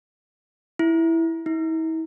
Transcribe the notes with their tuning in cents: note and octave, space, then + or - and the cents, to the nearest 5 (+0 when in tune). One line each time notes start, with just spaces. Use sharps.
E4 +0
E4 -40